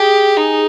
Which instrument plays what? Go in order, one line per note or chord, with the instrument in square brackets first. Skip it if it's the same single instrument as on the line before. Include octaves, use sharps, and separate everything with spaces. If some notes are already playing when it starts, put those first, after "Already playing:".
Already playing: [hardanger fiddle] G4 [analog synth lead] G#4
[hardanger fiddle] D#4